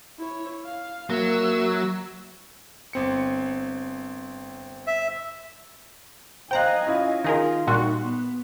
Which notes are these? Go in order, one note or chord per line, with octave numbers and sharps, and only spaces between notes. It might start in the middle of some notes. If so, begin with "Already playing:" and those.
E4 C#5
F5
F#3 A#3 E5 E6
G1 C4 C#7
E5
C5 D#5 F5 G5 G#5 A#5 F#6
C#4 E4 F4
D#3 F4 G#4 A#4 D#5
A#2 G3 D#4 F#4 C6 C#6 F#6
B3